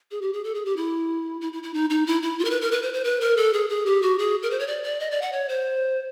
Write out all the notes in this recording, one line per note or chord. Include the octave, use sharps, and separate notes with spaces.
G#4
G4
G#4
A4
G#4
G4
E4
E4
E4
E4
D#4
D#4
E4
E4
F4
A#4
B4
A#4
B4
C5
C5
B4
A#4
A4
G#4
G#4
G4
F#4
G#4
A#4
C5
C#5
D5
D5
D#5
D5
F#5
C#5
C5